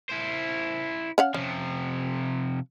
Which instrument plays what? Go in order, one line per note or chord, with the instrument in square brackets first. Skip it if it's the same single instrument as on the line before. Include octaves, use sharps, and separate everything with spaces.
[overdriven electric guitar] E4 C5
[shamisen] C#4 F5 F#5
[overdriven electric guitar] C3 F3 [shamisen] C#4